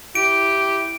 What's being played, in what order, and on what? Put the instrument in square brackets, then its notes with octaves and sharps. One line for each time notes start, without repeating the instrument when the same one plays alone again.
[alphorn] E4 [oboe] G4 [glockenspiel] D7